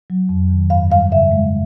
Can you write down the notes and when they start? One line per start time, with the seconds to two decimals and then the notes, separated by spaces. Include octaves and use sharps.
0.10 F#3
0.29 F2
0.50 D#3
0.70 G2 F5
0.91 G3 F5
1.12 C#3 E5
1.32 G#3